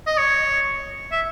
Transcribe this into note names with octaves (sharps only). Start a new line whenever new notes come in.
D#5
C#5
E5